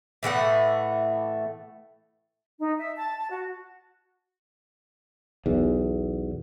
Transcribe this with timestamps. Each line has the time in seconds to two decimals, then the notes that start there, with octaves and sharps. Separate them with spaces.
0.23 A2 E3 A3 F#5
2.59 D#4
2.79 E5
2.98 A5
3.19 A5
3.31 F#4
5.46 B1 E2